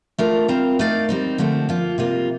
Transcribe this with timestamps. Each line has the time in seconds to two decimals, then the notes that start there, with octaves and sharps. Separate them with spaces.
0.18 A3 D4 F4 A#4
0.48 G3 C4 F4 A#4
0.79 A3 D#4 A#4 D5 F5
1.09 G3 C4 D#4
1.38 D3 F3 A3 C4
1.69 F3 A#3 F4
1.98 C3 G3 A#3 F4